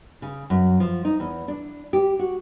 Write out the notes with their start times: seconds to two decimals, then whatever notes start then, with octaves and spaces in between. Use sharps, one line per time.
0.22 C#3
0.50 F#2
0.80 F3
1.05 D#4
1.20 E2
1.48 D4
1.93 G4
2.19 F#4